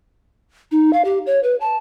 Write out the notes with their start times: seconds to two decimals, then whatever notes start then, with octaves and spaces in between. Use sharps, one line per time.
0.72 D#4
0.93 F5
1.05 G4
1.26 C#5
1.43 B4
1.61 A5